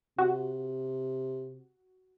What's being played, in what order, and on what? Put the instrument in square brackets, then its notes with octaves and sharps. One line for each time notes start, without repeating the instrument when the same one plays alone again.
[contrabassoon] C3 [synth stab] F#4